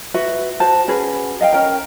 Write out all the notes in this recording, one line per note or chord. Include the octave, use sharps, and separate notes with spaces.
F#4 B4 E5
F#4 C5 A5
C#4 F#4 G#4 B4
D#5 F5 G5
C#4 A#4 G5